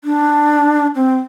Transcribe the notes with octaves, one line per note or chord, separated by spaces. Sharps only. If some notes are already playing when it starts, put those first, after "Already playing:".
D4
C4